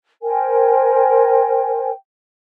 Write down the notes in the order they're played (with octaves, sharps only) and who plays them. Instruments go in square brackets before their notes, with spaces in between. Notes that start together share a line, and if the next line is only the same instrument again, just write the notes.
[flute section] A#4 C5 G5 G#5